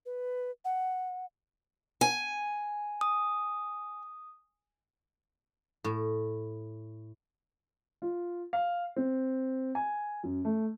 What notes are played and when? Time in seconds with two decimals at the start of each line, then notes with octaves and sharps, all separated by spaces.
0.06 B4
0.65 F#5
2.01 G#5
3.01 D#6
5.84 A2
8.02 F4
8.53 F5
8.96 C4
9.75 G#5
10.23 F#2
10.45 A3